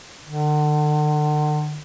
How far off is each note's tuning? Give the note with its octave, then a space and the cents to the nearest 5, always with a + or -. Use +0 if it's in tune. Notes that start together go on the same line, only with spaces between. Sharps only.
D3 +40